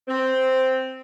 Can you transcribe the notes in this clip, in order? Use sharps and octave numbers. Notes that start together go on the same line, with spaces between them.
C4